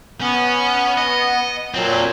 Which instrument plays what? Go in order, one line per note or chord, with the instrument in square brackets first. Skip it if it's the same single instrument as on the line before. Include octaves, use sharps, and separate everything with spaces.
[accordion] B3 [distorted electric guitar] C#4
[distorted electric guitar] D#5
[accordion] A#2 F#3 [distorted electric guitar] C4 A4